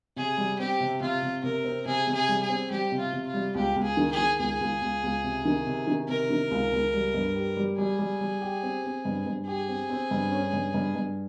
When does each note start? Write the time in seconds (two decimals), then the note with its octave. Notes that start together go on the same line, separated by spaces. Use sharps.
0.16 C3 G#4
0.38 G3
0.59 C4 G4
0.80 C3
1.01 C3 F4
1.22 C3
1.43 C3 A#4
1.65 C4
1.86 C3 G#4
2.07 C3
2.14 G#4
2.28 G3
2.42 G#4
2.49 C4
2.70 G3 G4
2.92 C3
2.98 F4
3.13 C3
3.27 F4
3.34 G3
3.55 C#2 G4
3.76 C#2
3.83 G#4
3.97 D#3
4.11 G#4
4.18 D#3
4.39 C#2 G#4
4.61 C#2
4.82 C#2
5.03 C#2
5.24 C3
5.45 D#3
5.67 C3
5.87 D#3
6.09 C3 A#4
6.30 D#3
6.51 C#2
6.73 C#2
6.94 G3
7.14 G2
7.36 G4
7.57 G3
7.78 G3 G#4
7.99 G3
8.21 G3
8.42 G4
8.63 C4
8.84 C4
9.05 G2
9.26 G2
9.47 G4 G#4
9.69 C4
9.90 C4
10.11 G2
10.32 C#4
10.53 G2
10.74 G2
10.95 G2